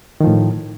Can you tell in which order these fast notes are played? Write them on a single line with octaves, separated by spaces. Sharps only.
D#3 F3 A2